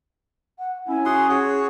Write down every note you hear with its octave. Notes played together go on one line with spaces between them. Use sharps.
F#5
C#4 E4 G#5
F#4 G#4 F#5 C6
F#4 G#4 C#5